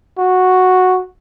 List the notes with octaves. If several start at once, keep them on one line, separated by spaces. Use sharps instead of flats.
F#4